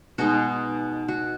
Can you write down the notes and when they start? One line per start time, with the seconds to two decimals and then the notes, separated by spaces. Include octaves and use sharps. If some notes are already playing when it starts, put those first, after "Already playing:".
0.18 B2 G#3 D#4 F#4
1.08 F#4